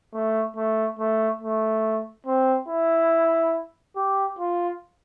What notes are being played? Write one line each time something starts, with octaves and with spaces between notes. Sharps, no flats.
A3
A3
A3
A3
C4
E4
G4
F4